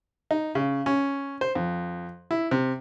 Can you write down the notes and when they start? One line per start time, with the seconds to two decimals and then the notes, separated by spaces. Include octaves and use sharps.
0.31 D#4
0.55 C#3
0.86 C#4
1.41 C5
1.55 F2
2.31 E4
2.51 C3